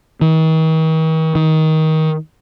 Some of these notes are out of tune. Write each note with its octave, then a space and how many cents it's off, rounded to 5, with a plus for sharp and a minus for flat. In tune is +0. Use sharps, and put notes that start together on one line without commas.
D#3 +45
D#3 +20